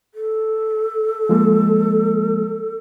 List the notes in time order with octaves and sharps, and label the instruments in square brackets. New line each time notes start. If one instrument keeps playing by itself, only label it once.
[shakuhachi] A4
[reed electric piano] F3 G#3 A#3